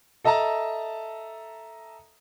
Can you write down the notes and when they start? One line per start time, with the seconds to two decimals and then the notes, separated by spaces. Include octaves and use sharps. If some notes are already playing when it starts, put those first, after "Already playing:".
0.24 A4 D#5 E5 A5 A#5